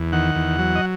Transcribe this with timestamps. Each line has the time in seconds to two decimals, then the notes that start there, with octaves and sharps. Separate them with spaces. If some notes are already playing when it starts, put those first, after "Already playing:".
Already playing: E2
0.13 D#3 F#5
0.35 E2
0.59 F#3
0.76 D#5